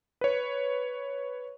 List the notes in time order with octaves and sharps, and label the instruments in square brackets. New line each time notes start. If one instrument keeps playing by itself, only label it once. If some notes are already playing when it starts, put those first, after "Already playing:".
[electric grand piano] B4 C#5